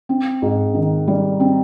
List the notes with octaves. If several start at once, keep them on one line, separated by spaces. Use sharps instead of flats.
C4
G#2
D#3
G3
C4